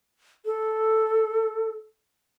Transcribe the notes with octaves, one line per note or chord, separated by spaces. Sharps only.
A4